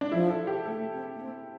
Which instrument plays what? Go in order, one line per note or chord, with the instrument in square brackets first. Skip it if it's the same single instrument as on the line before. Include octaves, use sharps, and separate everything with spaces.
[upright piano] D4
[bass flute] F3 [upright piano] E4
[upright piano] A4
G4
[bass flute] A3 [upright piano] A4
[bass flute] C4
A#3
C4